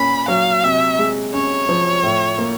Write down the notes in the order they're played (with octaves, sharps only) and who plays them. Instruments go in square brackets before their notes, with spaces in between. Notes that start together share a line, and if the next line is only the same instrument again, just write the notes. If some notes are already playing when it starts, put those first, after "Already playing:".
Already playing: [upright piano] A#2 A#3 C#4 [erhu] B5
[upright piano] F#3 [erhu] F5
[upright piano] C3 [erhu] E5
[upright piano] G#3
[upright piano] C#4 [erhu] C#5
[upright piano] F3
A2
A#3